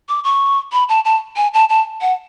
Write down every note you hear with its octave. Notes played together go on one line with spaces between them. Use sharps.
D6
C#6
B5
A5
A5
G#5
A5
A5
F#5